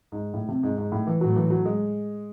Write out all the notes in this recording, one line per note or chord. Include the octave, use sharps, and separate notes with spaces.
G#2
A2
C3
G#2
G#2
A2
E3
A2 F#3
E3
F#3
G#3